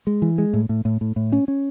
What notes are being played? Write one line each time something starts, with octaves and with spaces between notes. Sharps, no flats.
G#3
E3
G#3
A2
A2
A2
A2
A2
C#4
C#4